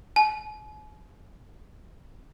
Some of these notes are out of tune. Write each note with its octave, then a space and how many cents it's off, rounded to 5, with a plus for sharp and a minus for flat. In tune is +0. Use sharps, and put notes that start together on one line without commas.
G#5 +45